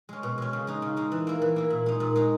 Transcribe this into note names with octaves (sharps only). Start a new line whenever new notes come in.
G#3 C#4
B2
G#3 C#4
C#3
G#3 D#4
C#3
G#3 D#4
E3
A#3 E4
E3
A#3 E4
A#2
G#3 D#4
A#2
G#3 D#4